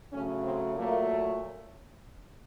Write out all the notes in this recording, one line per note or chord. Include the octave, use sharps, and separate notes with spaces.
C#3 F#3 A3 C#4
C4
A#2 F#3 A3 A#3